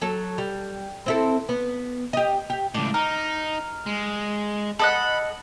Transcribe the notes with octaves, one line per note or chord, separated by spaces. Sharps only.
F#3 A4
G3
C4 E4 A4
B3
G4 D#5
G4
C#2 A2 D4
D#4 A#4
G#3
A4 D#5 F#5 B5